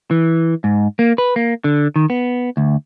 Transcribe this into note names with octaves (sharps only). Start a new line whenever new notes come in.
E3
G#2
A#3
B4
A#3
D3
D#3
B3
D2